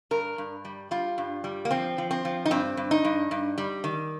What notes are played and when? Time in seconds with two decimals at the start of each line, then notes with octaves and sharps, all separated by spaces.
0.11 G2 A#4
0.38 G2
0.65 G3
0.91 G3 F4
1.18 G2
1.44 G3
1.65 A#3
1.71 F3 C4
1.98 F3
2.11 C4
2.25 F3
2.46 D#4
2.51 G2 C4
2.77 G2
2.91 D#4
3.05 G2
3.31 G2
3.58 G3
3.84 D#3